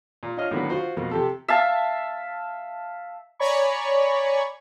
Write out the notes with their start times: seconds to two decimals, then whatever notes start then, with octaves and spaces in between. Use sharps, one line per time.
0.23 A#2
0.37 D4 F4 C#5 D#5 F6
0.51 A2 D3 D#3 F#3 A#3 B3
0.70 F4 F#4 C5
0.97 F2 B2 A#3
1.11 C3 G4 A4
1.48 E5 F5 A5
3.39 C#5 D5 G#5 A#5 B5 C#6